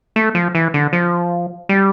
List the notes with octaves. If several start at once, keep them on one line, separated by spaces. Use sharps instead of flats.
A3
F3
E3
D3
F3
G3